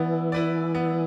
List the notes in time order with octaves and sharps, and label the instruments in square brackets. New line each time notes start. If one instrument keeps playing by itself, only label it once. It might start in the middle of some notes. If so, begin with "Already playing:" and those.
Already playing: [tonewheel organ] E3 [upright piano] B3 E4 D5
[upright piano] E4 B4 D5
B3